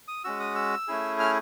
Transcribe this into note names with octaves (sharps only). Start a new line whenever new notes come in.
D#6
G#3 C#4 F#4 E6
D#6
E6
A3 C#4 E4 G#4
F6